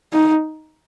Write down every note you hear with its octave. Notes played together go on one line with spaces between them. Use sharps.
D#4